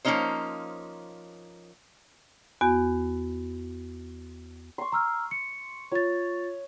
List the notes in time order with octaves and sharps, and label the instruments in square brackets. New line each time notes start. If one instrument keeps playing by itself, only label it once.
[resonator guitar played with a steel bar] F3 A#3 C4 C#4 D#4 C5
[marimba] E2 B3 F#4 G#5
[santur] C6 C#6
[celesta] A#5 E6 F6
C#7
[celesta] F4 A6 [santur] C#5